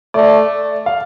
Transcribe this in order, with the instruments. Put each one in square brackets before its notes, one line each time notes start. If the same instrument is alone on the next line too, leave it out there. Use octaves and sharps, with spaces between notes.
[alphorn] A3 [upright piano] D5
[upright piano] F5